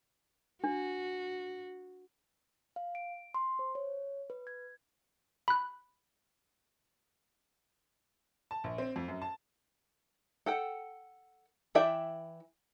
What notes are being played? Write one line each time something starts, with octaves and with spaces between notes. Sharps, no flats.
D4 F#4
F5
D7
C6
C5
C#5
B4
G#6
B5 F#6
A5
A#1
C4
F2
F#2
A5
A4 F#5 G5
E3 E4 D5 E5 G5